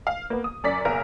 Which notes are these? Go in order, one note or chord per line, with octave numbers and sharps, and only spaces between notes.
F5
A#3 B3
D#6
F#2 D5 B6
F#1 B1 A#4